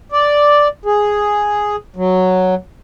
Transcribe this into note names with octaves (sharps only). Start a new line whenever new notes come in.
D5
G#4
F#3